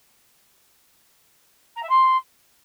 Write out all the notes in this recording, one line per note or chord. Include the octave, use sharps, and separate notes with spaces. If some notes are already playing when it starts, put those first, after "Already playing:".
A#5
E5
C6